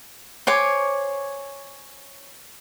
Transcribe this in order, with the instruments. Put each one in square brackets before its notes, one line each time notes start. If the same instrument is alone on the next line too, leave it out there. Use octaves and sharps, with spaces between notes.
[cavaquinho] C5 C#5 G#5 D6